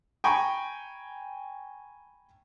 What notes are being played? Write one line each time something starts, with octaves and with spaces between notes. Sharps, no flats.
G5 G#5 A#5 B5 C#6